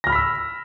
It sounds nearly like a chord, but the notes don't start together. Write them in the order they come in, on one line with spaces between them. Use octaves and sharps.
A#6 F6 B5 B6 E6